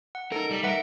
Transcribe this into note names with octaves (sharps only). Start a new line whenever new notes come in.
F#5
D#4 A4 A#4
G3
A#4 B4 E5 F#5